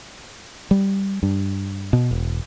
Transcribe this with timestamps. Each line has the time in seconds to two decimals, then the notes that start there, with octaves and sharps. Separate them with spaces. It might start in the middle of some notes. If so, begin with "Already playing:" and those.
0.71 G3
1.23 G2
1.93 B2
2.11 E1